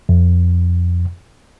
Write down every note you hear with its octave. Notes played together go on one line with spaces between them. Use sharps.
F2